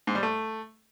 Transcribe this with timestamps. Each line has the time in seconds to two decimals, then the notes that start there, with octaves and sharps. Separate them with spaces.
0.07 G#2
0.15 G3
0.23 A3